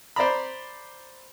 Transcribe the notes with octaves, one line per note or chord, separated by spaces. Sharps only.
C5 D5 A#5 B5